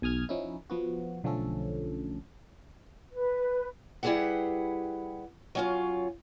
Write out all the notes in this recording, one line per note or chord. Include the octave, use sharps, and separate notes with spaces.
B1 G#5 D#6 F6 G#6
F3 C#4 D#4 E4
F3 B3 F#4
B1 D3 F3 A3 C#4 A4
B4
G3 E4 G4 G#4 B4 F#5
F#3 C#4 F4